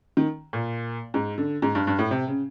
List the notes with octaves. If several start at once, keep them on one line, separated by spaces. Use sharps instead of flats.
D#3
A#2
G#2
D3
G#2
G2
G2
A2
C3
C#3